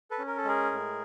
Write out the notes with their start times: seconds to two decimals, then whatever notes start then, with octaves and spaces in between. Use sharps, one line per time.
0.11 A4 B4
0.19 C#4
0.27 A#4
0.37 A4
0.44 G#3 G#4 A#4
0.71 A2